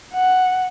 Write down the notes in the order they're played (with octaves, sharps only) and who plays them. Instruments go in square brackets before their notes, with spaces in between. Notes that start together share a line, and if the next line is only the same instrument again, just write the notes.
[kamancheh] F#5